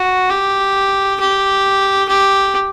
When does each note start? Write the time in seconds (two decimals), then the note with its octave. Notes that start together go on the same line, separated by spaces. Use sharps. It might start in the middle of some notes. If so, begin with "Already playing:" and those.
Already playing: F#4
0.30 G4
1.20 G4
2.09 G4